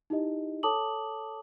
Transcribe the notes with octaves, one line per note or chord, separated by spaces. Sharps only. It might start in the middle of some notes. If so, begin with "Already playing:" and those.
D#4 E4 G4 D#5
A4 C#5 A5 D6 D#6 F#7